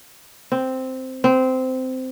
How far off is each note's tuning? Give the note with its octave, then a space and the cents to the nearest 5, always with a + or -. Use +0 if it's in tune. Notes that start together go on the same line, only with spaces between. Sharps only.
C4 -5
C4 -15